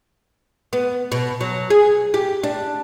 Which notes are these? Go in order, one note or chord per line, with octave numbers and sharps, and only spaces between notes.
B3
B2
F#3
G#4
G4
D4